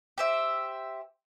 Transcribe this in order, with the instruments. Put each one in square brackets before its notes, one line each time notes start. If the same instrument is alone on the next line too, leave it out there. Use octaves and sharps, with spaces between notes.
[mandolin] G4 C5 E5